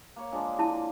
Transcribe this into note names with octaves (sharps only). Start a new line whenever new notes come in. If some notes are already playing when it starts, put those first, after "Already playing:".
A#3 C#5
F3 G#3 D4
E4 A5